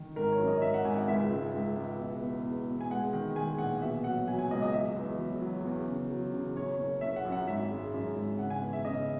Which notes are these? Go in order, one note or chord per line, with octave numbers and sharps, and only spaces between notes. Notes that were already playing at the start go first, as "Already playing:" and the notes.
Already playing: D#3
G#1 A#4
C#5
F#2
D#5
G#1 E5
F#5
G#1 G#5
F#5
C#2 E5
C#2
C#2
C#2
B2
E2
E2
B2
G#5
G#3 F#5
D#3
G#3 G#5
A#1 F#5
B2 E5
F#3 F#5
F#3 G#5
G#5
C#2 D#5
D#5
F#3 E5
E2
F#3
F#3
E2
C#3
F#3
C#3
F#2 C#5
F#1
F#1 E5
F#5
F#2
F#5
G#1 E5
G#3
F#2
G#1
C#3 F#5
G#5
E2
E5
C#3 D#5